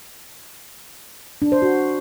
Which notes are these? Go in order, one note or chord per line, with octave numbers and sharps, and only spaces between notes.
D4
C5
F#4